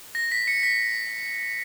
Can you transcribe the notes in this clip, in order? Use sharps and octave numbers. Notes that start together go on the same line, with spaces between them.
A#6
B6
C#7
B6